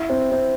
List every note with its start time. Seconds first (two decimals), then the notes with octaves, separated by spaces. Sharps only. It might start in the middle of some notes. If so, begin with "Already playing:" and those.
Already playing: E4
0.10 C4
0.32 C4